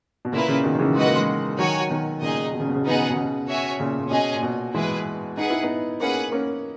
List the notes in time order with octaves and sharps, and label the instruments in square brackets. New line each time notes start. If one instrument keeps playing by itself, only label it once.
[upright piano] B2
[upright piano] A#2 C#3 [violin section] A#3 E4 B4
[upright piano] A#2 C#3
B2 D#3
D#3
C#3 E3
[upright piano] G#3 [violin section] F#4 B4 D#5 F#5
[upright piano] A#3
E3 G#3
[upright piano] D#3 F#3 [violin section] F#4 C#5 G#5
[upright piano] B2 D#3
[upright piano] A#2 C#3 [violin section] D#4 G#4 D#5
[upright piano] B2
C#3
B2
C#3
B2
[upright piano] C#3 [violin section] B3 D#4 G#4 D#5 F#5
[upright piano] B2
C#3
B2
C#3
B2
[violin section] F#4 C#5 E5 G#5
[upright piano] A#2 C#3
A#2
[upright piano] B2 [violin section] C#4 G#4 D#5 G#5
[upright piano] A#2
B2
[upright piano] E3 G#3 [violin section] E4 G#4 B4
[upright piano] D#4 [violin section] G#4 B4 F#5
[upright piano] E4
B3 D#4
[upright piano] A#3 C#4 [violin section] G#4 B4 F#5
[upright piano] A#3 C#4